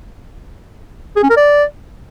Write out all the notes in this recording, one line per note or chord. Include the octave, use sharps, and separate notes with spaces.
G#4
C#4
A#4
D5